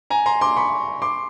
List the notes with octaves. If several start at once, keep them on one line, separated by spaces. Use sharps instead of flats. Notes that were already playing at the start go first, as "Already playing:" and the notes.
G#5 A#5
A#5 C6
C6 D6
B5 C#6
C6 D6